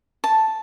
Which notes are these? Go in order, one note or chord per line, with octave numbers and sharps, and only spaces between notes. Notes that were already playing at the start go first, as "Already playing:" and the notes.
A5